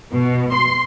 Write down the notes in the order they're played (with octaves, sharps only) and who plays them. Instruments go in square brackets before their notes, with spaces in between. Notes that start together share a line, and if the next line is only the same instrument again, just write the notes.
[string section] B2
C6